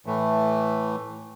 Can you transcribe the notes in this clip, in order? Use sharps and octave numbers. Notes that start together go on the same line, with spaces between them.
A2 E3 A3